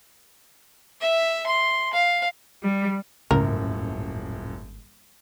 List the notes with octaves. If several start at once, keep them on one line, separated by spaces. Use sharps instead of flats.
E5
C6
F5
G3
D#1 G#1 C#2 F#2 A2 A#4